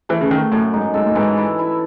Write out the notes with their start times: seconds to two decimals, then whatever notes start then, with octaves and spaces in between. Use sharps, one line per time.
0.09 E3 A3
0.21 C#3
0.31 D#3 A3
0.52 F#2 A2
0.74 G#2 D#4
0.94 G#2 A4
1.06 A2
1.15 G#2 E3
1.38 E4
1.59 E4